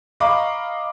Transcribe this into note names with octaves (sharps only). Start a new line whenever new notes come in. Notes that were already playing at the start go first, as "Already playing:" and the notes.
D#5 F5 A#5 B5 C#6 D6